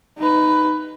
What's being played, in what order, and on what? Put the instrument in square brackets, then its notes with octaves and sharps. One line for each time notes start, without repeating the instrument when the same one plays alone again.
[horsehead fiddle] D#4 B4